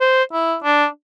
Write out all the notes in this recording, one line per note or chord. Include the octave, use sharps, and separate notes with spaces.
C5
E4
D4